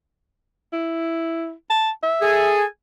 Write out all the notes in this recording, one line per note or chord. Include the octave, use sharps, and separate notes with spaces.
E4
A5
E5
G#4 A4 G#5